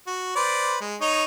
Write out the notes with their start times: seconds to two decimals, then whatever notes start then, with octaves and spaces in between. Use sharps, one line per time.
0.07 F#4
0.36 B4 C5 D5
0.81 G#3
1.01 D#4 C#5 D#5